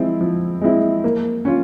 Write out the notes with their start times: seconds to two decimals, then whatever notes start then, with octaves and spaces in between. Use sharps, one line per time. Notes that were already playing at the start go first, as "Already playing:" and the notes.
Already playing: F3 G#3 C4 E4
0.21 F3
0.61 G#3 C4 E4
1.04 A#3
1.45 C#4 F4